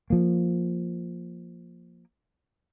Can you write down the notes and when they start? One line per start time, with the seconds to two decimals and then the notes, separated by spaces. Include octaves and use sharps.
0.10 F3 A#3